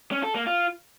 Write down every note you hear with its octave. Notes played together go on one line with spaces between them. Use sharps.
C#4
A4
A#3
F4